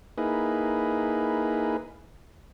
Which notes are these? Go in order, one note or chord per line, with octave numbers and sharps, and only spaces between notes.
A#3 D#4 E4 G#4 B4